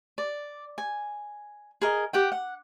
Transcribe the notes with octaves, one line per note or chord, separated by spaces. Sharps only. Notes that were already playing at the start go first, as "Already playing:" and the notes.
D5
G#5
G#4 A#4 D#5
G4 F#5 G5
F#5